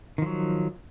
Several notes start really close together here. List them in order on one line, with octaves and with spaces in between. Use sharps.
D#3 F3 F#3